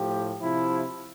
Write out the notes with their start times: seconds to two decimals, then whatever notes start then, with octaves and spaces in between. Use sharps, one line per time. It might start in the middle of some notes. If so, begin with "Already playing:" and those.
Already playing: A2 F3 G4
0.42 C3 F3 E4